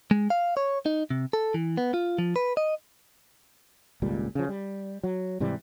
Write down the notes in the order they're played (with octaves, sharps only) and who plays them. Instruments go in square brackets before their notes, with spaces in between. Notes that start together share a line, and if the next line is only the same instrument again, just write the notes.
[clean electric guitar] G#3
F5
C#5
D#4
C3
A4
E3
B3
F4
F3
B4
D#5
[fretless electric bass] G#1 C#2 A#2 G3
C#3 F3
G3
F#3
G#2 C3 E3 G3